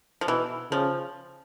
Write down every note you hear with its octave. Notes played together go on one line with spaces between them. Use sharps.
F3
B2 E3
C#3 F3